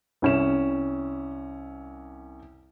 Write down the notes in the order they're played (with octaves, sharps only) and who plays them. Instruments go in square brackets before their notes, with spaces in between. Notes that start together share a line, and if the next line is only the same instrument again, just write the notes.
[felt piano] C2 C#4 E7